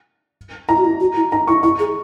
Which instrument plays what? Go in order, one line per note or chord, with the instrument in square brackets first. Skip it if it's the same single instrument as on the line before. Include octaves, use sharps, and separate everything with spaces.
[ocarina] E4 [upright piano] A#5
[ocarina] F#4
E4
F#4
E4
[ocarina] D#4 [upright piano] A#5
[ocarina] E4 [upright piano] C#6
[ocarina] E4 [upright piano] C#6
[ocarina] G#4